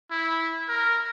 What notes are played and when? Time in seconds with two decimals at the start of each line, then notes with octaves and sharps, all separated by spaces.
0.11 E4
0.68 A#4